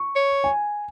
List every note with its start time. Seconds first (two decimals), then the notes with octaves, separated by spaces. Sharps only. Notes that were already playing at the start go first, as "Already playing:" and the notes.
Already playing: C#6
0.16 C#5
0.44 G#5